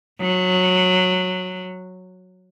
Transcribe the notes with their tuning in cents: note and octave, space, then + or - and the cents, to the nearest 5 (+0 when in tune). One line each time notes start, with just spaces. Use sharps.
F#3 -15